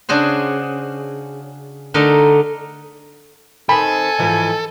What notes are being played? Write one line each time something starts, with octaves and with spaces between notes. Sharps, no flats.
C#3 D4 F#4 G#4 C5
D3 A3 D#4 A#4
D#3 C4 A4 G#5 B5
G#2 E3 F3